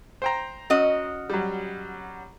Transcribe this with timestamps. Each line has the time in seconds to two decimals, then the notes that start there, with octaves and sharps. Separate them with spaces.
0.22 C5 G5 A#5
0.70 C#4 F#4 D#5
1.30 F#3 G3